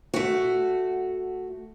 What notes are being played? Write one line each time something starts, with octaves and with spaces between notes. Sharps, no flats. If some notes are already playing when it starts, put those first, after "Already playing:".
A3 F#4